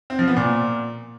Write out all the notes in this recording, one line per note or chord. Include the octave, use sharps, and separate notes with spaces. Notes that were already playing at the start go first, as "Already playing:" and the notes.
C4
F3
B3
A#2